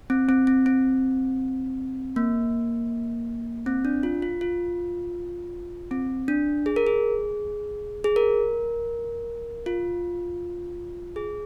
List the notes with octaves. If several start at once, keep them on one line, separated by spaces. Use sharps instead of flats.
C4
C4
C4
C4
A#3
C4
D4
F4
F4
F4
C4
D4
G#4
A#4
G#4
G#4
A#4
F4
G#4